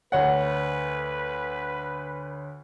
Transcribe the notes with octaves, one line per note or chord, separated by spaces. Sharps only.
D2 B4 C#5 F#5